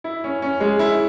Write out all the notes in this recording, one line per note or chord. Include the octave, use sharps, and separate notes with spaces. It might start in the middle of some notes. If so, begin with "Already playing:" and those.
E4
C#4
C#4
G#3
E4